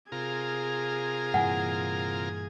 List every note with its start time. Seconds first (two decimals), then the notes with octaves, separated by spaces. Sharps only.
0.12 C3 F4 G#4 A#4 G#6
1.34 G2 A#2 E3 F#5 G#5